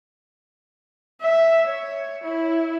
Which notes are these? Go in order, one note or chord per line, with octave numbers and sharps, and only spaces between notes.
E5
C#5
E4